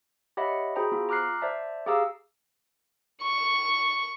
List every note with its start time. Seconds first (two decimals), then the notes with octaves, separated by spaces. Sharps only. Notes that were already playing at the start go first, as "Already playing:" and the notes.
0.37 G4 C#5 D#5 E5 F#5 B5
0.76 F#4 G#4 C5 G5 A#5 B5
0.92 B3 F4
1.09 A#5 D6 F6 F#6 C7
1.42 C5 D5 E5 A5
1.86 G4 G#4 F5 A#5 D6 E6
3.23 C#6